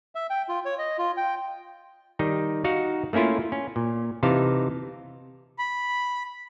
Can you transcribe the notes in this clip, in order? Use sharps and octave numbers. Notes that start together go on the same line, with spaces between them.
E5
G5
F4
C#5
D#5
F4
G5
D#3 G3 D#4
D#4 F#4 F5 F#5
A3 A#3 C#4 E4 F4
C#4
A#2
C3 E3 D#4 F5 A5
B5